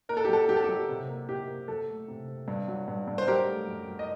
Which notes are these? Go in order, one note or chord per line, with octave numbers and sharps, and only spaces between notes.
A#3 A#4
A4
G4
F#3 A4
F#3 G4
A4
F#3 G4
C3
A#3
C3 G4
A#3
F#3 A4
A3
C3
C3
G2
F#3
G2
G2
C5
F#3 G4 A#4
A3
F#2
F#3
D#5